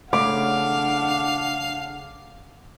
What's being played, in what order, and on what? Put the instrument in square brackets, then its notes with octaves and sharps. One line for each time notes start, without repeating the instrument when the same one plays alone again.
[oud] C#3 A3 [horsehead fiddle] D4 F#5 [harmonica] F5 [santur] D6